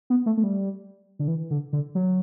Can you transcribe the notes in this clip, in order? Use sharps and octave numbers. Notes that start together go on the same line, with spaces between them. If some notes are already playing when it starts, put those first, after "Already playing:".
B3
A3
A3
G3
D3
E3
D3
D3
F#3